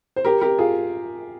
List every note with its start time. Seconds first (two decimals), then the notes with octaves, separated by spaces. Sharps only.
0.16 C5
0.25 G4 A#4
0.41 G4 A#4
0.59 F4 G#4